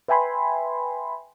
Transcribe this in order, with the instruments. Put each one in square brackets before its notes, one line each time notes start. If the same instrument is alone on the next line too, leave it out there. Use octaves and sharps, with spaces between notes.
[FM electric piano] B4 E5 G5 G#5 B5 C6